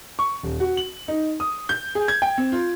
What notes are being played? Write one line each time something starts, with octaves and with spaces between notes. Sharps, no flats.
C#6
D#1
F#4
F#7
D#4
D#6
G6
G#4
G#6
G5
C4
F4